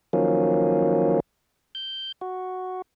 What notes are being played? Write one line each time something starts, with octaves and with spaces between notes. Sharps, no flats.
D#3 F3 F#3 A#3 C#4
G6
F#4